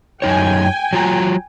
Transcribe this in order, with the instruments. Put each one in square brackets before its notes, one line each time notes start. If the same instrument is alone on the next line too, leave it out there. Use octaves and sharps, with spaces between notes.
[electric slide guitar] F#2 D#4 C#5 [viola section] G5 G#5
[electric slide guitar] F#3 F4 A#5